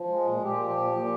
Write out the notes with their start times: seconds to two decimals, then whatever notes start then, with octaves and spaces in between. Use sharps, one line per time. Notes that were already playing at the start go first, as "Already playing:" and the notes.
Already playing: F3
0.08 G#3
0.25 A#2
0.42 A#2 G4
0.59 F3
0.76 A#2
0.93 A#2